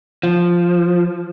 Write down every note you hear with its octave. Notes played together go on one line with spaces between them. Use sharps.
F3